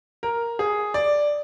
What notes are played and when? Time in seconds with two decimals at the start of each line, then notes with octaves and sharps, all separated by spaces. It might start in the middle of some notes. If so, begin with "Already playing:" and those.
0.23 A#4
0.59 G#4
0.94 D5